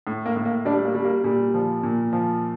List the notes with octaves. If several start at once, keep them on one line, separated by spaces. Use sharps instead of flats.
A2
A#3
A2
A#3
G3 D4
A#3
G3
A#3
A#2 G3
F3
A#2
F3